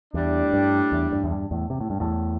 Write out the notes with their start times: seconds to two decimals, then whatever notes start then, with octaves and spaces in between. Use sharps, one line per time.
0.14 E2 A2 G3 D4
0.53 G2
0.92 E2
1.12 G2
1.24 E2
1.31 G2
1.51 E2 A2
1.70 C3
1.80 A2
1.90 G2
2.00 E2 A2